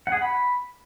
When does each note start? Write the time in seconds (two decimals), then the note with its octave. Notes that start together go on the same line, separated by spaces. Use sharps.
0.07 F#5
0.12 G#4
0.17 F#5
0.22 B5